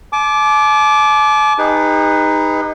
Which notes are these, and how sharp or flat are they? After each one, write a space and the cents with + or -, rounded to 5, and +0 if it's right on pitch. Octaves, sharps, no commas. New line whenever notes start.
A5 -45 D6 +0
D#4 +0 G#4 -45 B4 +0